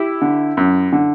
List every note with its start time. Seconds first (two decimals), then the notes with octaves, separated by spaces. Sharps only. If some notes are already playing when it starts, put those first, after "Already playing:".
Already playing: E4 G4
0.22 D3
0.57 F#2
0.93 D3